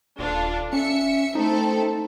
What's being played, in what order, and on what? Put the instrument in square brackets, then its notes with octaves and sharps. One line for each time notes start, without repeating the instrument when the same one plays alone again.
[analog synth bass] D#1 [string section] D4 F4 A4
[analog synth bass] C#4 [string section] E5 C#7
[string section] A3 C4 A4 [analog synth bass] D#4